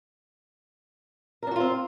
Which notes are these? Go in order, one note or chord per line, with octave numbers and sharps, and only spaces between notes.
C4 D4 F4 F#4 A#4